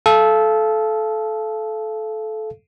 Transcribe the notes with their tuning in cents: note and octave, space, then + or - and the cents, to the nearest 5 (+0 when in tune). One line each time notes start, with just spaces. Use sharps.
A4 -20 F5 -30